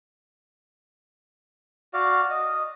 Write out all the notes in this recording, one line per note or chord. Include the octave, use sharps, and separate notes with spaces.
F#4 D5 F5
D#5